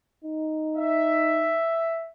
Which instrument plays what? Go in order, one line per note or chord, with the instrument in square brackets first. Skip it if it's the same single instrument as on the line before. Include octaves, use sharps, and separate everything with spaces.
[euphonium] D#4
[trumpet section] E5